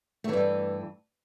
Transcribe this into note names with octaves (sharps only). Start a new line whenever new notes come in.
G2 E3 A3